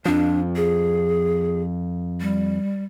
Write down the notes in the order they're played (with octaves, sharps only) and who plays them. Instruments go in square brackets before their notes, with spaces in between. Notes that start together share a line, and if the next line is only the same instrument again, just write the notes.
[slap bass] F2 F3 [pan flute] D4
[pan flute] G#4
G3